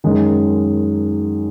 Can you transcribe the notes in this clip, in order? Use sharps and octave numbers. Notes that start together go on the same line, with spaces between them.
F#2 D#3 G#3